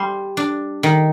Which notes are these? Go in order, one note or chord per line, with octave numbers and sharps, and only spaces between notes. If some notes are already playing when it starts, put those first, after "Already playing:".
Already playing: G3 C6
D4
D#3